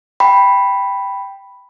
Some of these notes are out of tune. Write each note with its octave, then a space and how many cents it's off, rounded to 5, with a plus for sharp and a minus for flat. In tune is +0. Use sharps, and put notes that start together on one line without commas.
G5 +0 B5 +0